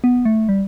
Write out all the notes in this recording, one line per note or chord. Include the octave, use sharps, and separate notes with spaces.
B3
A3
G3